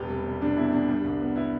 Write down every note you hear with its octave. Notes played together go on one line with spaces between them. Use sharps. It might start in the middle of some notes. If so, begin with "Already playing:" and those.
Already playing: E1 G3 G4 B4
C3
C3
C3 D4
E2 E4
E2 D4
G3
C2
B3
B3 E4